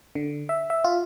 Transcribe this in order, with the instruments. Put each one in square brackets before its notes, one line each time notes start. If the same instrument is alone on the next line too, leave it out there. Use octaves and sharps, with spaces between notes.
[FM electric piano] D3
E5
E5
F4